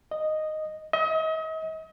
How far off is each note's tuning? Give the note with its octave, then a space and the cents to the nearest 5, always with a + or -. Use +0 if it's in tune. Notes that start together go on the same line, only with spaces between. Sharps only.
D#5 -5
D#5 +40